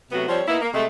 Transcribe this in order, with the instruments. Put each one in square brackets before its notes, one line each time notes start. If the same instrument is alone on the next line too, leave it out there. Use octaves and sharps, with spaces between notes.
[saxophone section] C3 F#3 A3 B3 F#4
F3 G3 C4 C5 C#5
A#3 B3 D#4 E4
A#3
C3 G#3 A3